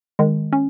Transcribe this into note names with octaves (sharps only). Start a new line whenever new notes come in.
D#3 G#3
C#4